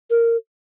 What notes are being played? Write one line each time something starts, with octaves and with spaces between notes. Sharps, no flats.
A#4